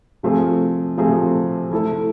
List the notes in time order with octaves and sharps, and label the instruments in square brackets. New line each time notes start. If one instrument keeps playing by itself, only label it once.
[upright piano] C3 F3 A3 C4 G#4
C3 F3 A3 C4 G#4
A3 E4 A4